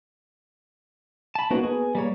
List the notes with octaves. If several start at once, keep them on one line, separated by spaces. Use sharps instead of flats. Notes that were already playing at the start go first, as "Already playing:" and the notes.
A5 B5
A#3 B3 D#4 F#4
G#4
G3 A#3 C#5